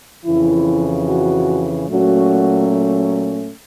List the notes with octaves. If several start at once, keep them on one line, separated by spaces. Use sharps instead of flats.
F2 C#3 E3 E4
F#4
A#2 F#3 A3 C#4 F#4